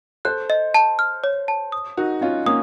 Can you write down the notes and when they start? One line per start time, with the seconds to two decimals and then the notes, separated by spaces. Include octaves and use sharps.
0.25 A4 C5 F#6
0.50 D#5
0.74 A5
0.99 F6
1.24 C#5
1.48 A5
1.72 D#6
1.97 D#4 F#4 A#4
2.21 C#4 F4 D#5
2.46 A#3 C#4 D#6